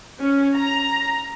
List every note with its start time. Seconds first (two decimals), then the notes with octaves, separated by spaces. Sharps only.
0.20 C#4
0.56 A#5